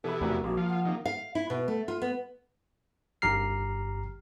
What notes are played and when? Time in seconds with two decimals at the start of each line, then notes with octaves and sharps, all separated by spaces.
0.04 B2 E3 G4 A4 E5 B5
0.21 F1 E2 A3 F#4 A#4 D5
0.44 A#1 G#3 A#3 F#4
0.57 F3 F4
0.69 F#5
0.85 D#3 G3 A#3
1.05 F5
1.35 E4
1.50 B2
1.68 A3
1.88 F4
2.02 B3
3.22 G1 G2 G4 A#5 F6 C7